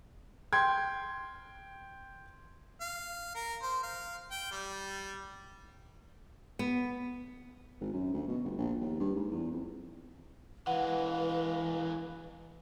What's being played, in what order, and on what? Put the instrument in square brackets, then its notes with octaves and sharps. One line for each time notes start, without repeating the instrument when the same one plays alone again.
[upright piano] G5 C6 G#6
[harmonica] F5
A#4
C5
F5
G5
G3
[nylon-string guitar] B3
[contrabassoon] G#1
F#2
D2
B2
G1
A#1
D#2
G2
G#2
E2
F2
[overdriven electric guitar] E3 G#3 [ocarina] B4 [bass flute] F5 [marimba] F#5